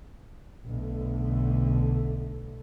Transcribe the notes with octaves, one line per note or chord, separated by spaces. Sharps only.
B1 D3 A3